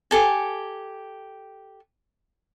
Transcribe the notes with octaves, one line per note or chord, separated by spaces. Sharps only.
G4 A4 G#5